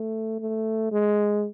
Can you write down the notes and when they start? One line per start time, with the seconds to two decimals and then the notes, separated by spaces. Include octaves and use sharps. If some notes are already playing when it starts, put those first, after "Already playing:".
Already playing: A3
0.40 A3
0.92 G#3